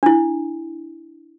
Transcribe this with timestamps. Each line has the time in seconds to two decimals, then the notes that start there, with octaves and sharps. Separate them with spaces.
0.03 D4 E4